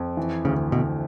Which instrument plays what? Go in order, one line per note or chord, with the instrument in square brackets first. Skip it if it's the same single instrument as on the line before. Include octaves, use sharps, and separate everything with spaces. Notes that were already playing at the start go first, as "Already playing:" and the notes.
Already playing: [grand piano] F2
E3
[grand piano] D2 [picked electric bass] C#3
[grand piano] D2 [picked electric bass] B2